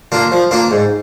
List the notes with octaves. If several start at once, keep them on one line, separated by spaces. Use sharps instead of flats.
A#3 D4 F4
F3
A#3 D4 F4
G#2